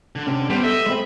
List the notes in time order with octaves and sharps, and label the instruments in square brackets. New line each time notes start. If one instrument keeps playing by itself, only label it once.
[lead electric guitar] D3
[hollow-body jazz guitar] C3 C#4
[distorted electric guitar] G3 [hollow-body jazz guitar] B3 [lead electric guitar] C4 C5
[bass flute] A4 [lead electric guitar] D#5 [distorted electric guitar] E5
[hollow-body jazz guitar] G#3 C4 [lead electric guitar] B5